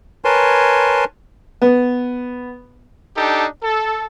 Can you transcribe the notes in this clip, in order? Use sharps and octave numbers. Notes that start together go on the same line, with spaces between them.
A#4 B4 C#5 G#5 A5 C6
B3
D4 D#4 G4 A4
A4